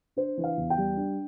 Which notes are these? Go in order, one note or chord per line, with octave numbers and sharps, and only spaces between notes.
D4 C5
E3
F5
E2
G5
G3
D4